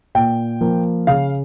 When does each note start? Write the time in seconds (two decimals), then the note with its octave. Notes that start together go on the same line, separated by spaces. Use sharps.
0.15 A#2 G5
0.61 F3 A#3
1.07 C#3 F5